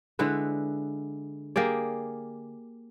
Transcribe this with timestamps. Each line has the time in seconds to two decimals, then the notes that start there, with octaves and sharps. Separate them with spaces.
0.19 D3 G#3 E4 B4
1.56 A#3 G4 G#4 D5